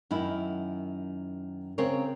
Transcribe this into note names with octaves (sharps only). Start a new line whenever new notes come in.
F#2 D#3 E4
C#3 C4 G#4 A#4 C#5